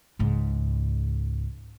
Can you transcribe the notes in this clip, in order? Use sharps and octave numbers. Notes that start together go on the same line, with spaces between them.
C#2 G#2